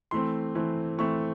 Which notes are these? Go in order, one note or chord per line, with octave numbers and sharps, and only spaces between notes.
E3 A3 C4 C6
E3 A3 C4
E3 A3 C4 C#6